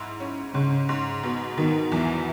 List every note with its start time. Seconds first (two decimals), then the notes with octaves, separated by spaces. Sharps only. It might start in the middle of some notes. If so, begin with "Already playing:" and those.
Already playing: G#2 E4
0.20 C#4
0.54 G#2 C#3
0.89 G#2
1.23 B2
1.57 B2 D#3
1.91 E2 E3